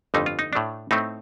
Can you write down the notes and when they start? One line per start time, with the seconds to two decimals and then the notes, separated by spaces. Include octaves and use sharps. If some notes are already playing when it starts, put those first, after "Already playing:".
0.14 G1 F2 D3 A3 D#4
0.26 F4
0.39 D#4
0.53 A2 A3 D4
0.91 A2 A3 C4 D#4